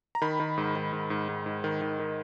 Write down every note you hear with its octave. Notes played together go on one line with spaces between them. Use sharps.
A#5
D#3 B5
D#3
G#2
D#3
G#2
G#2
G#2
G#2
D#3
D#3
D#3